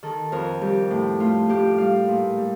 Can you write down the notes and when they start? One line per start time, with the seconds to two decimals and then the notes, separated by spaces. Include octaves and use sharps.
0.03 D#3 A4
0.32 F2 A#4
0.61 G3 G4
0.90 A2
1.20 A3 F4
1.49 A2 G4
1.78 G3 F5
2.08 A#2
2.38 G3